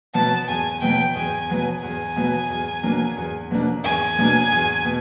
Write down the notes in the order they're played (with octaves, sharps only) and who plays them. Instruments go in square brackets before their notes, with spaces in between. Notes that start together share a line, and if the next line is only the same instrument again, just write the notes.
[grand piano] B2 F#3 B3 [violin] A5
[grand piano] E2 [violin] G#5
[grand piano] B2 F#3 B3 [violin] G5
[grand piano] E2 [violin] G#5
[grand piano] B2 F#3 B3
[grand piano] E2 [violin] G#5
[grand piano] B2 F#3 B3
E2
B2 F#3 A#3 D4
E2
B2 F#3 A#3 D4
[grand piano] E2 [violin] G#5
[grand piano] B2 F#3 A#3 D4
E2
B2